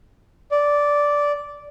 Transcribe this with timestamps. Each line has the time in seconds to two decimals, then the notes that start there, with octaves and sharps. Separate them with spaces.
0.51 D5